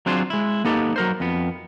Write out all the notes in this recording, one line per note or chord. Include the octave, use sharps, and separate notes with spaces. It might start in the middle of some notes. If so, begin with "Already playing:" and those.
F#3 C4 D4 F4 G#4 C5
G#3 E4
A#3 B3 D#4 G4 A4
F#3 A#4 C5
F2 B3